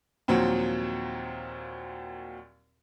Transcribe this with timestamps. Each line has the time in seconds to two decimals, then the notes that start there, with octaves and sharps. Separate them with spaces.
0.28 D#2 A#2 F3 F#3 C4